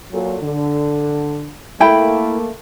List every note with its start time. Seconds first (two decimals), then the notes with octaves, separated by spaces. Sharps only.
0.12 A#2 F#3 A4
0.43 D3
1.80 A3 A#3 E4 G5 B5